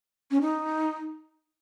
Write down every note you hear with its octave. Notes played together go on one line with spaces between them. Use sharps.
C#4
D#4